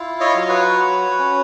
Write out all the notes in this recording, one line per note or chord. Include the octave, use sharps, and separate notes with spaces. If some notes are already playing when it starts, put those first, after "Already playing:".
Already playing: E4 F4
C#5 D#5
F#3
B4 C#5
F#4
C#4